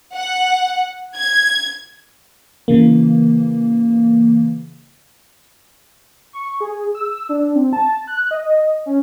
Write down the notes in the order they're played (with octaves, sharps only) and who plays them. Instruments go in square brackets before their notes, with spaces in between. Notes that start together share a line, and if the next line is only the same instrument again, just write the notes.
[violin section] F#5
G#6
[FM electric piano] C#3 E3 A#3
[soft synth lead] C#6
G#4
E6
E6
D4
C4
A5
F#6
D#5
C#4